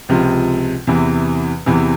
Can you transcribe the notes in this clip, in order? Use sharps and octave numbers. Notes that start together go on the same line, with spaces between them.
C#2 C3 F3
E2 C3 E3
E2 C3 E3